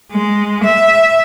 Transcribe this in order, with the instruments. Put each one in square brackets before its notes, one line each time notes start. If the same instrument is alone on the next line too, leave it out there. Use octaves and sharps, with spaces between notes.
[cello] G#3
E5